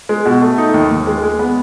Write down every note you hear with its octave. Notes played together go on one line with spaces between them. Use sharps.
G#3
B2
A3
D#4
D#2
D#2
G#3
G#3
B3